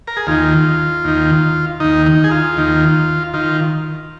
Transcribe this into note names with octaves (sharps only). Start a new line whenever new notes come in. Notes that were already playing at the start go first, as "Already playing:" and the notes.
A#4
G#4
D#2 D#3 F4
D#2 D#3
D#2 D#3 D#4
D#4
G#4
F4
D#2 D#3
D#3 F4